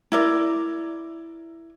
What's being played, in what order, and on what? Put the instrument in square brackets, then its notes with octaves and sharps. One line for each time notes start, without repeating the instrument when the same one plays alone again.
[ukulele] E4 A#4 D5